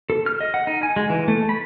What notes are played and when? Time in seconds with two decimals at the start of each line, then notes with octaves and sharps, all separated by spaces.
0.10 A4
0.26 F6
0.41 D#5
0.54 F#5
0.67 D#4
0.83 G#5
0.96 G#3
1.10 E3
1.28 A3
1.49 B5